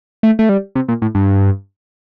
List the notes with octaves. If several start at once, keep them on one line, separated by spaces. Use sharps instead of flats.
A3
A3
G3
C3
A#2
A2
G2